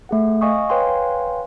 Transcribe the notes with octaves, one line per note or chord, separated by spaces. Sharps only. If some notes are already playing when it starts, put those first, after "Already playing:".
A3 G#4 F#5
D#5 F5 G#5 C#6 D#6
B4 C#5 F5 G5 G#5 C6